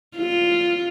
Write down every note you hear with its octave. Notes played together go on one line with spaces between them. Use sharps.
F4